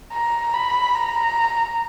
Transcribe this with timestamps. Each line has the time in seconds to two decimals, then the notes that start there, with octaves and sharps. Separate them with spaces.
0.13 A#5
0.54 B5
0.95 A#5